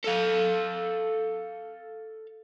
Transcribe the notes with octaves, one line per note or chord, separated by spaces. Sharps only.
A4 F5